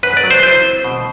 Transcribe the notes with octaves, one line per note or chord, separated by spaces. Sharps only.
F#2 B4
D5
F#3
C5
E4 C5
C4
B2